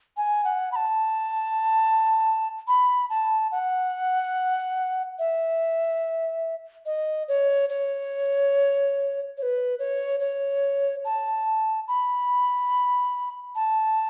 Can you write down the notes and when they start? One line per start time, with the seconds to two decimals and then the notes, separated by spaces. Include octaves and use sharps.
0.17 G#5
0.45 F#5
0.72 B5
0.76 A5
2.68 B5
3.10 A5
3.52 F#5
5.19 E5
6.86 D#5
7.28 C#5
7.69 C#5
9.38 C#5
9.43 B4
9.79 C#5
10.20 C#5
11.05 A5
11.88 B5
13.55 A5